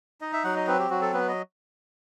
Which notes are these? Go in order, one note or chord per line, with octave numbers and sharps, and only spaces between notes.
D#4 D#5
E5
F#3 F#5
D#5
C4 B4
G4
F#3 F#4
A4
B3 B4
D#5